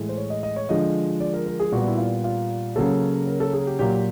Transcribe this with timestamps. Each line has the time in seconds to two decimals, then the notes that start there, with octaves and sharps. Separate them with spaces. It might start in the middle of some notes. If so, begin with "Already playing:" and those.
Already playing: A2 E3 G#3
0.09 C5
0.17 C#5
0.30 D#5
0.43 D#5
0.56 C#5
0.69 D3 F3 G#3 D#5
1.20 D5
1.34 A#4
1.46 A#4
1.60 G#4
1.72 A#2 G3 B3 F#4
1.87 E4
1.98 F4
2.24 F4
2.76 C#3 F#3 A#3 A4
3.27 A#4
3.40 A4
3.53 G#4
3.67 G4
3.79 A#2 F#3 A#3 G4